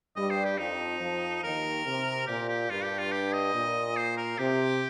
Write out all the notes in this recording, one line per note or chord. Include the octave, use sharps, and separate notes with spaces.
G2 G3 D#5
C5
G4
F2 F3 D#4
F2 F3
D#2 D#3 A#4
C3
A#2 G4
G4
G2 F4
G4
F4
G4
D#5
A#2
C5
A#4
C3 G4